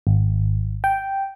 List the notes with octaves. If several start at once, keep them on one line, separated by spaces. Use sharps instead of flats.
G#1
G5